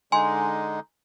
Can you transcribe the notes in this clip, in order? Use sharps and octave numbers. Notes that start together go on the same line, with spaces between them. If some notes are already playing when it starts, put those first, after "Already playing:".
D3 G#3 D#4 G#5 C6